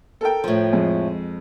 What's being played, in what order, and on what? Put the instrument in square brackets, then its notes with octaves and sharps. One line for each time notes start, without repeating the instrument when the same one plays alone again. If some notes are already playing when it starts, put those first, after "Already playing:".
[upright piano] A4 A#4 G5
[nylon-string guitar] A2 F3
[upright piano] F2 G#3